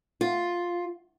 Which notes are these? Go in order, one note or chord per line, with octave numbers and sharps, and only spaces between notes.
F4